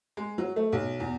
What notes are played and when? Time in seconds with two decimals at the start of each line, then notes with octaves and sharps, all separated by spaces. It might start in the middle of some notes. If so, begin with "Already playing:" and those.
0.17 G#3
0.38 F#3
0.56 A3
0.72 B1
1.00 E2